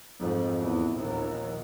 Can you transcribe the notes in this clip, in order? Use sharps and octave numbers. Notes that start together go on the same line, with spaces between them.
F2 G#2
E2
A#1 D#2